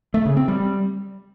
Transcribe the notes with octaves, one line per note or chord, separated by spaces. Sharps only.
A3
C#3
C4
G3